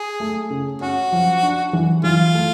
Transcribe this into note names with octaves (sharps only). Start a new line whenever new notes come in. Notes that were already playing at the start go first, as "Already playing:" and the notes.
Already playing: G#4
A3
C#3
C#4 F#4
F3
D4
E3
E3 F4
A3